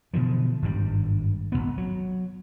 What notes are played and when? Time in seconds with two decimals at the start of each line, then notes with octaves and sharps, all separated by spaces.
0.14 B2 D3 E3 F3
0.62 G#1 G2 C3 G3
1.52 G#1 F2 B3
1.78 F#3